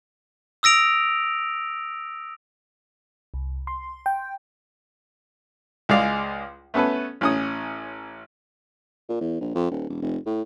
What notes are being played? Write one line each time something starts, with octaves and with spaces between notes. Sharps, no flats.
D#6 E6 A#6 D7 F7
C2
C6
G5
C#2 G#3 G#4 D5 F5
A3 B3 C#4 A4 B4
A1 C#4 D#6
A#2
E2
A#1
F2
D#1
E1
F1
A2